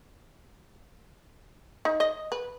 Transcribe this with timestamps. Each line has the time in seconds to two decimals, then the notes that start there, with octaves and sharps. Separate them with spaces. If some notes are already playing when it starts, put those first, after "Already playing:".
1.85 D#4
2.00 D#5
2.32 B4